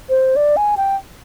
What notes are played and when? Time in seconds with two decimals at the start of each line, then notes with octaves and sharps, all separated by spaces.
0.09 C5
0.36 D5
0.57 G#5
0.77 G5